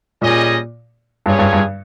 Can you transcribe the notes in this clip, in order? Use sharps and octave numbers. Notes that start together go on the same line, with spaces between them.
A#2 G3 C#4 G#4 D#5
G2 C#4 F4 G#4 C#5
G2
G2